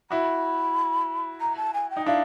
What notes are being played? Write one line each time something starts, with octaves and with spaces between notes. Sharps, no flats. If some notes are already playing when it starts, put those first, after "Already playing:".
E4 F#4 B5
A#5
A5
G#5
G5
D#4
D4 E4 F5